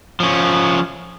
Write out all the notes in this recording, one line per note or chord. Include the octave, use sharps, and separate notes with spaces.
F3 C#4